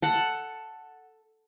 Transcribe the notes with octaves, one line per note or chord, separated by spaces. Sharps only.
A4 F#5